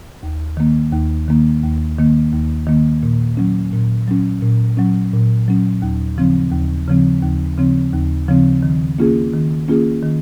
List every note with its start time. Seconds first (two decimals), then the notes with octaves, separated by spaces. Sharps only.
0.23 D#2
0.57 D#3 A#3
0.93 D#2
1.28 D#3 A#3
1.63 D#2
1.98 D#3 A#3
2.32 D#2
2.67 D#3 A#3
3.03 A#2
3.37 F#3 C#4
3.73 A#2
4.08 F#3 C#4
4.42 A#2
4.77 F#3 C#4
5.13 A#2
5.48 F#3 C#4
5.82 D#2
6.18 C#3 F3 C4
6.52 D#2
6.88 C#3 F3 C4
7.22 D#2
7.58 C#3 F3 C4
7.93 D#2
8.28 C#3 F3 C4
8.63 D#3
8.99 A#3 C#4 F4 G#4
9.34 D#3
9.68 A#3 C#4 F4 G#4
10.03 D#3